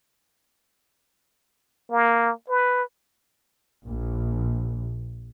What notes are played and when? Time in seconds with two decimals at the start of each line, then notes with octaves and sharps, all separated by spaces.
1.90 A#3
2.49 B4
3.87 A#1